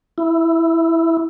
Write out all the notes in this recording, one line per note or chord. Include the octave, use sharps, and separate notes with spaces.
E4